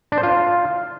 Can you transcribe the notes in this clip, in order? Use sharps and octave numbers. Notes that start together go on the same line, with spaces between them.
D4
C5
F4